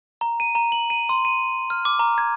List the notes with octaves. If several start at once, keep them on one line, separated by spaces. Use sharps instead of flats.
A#5
D#7
A#5
F#7
D#7
C6
D#7
F6
D6
A#5
G#6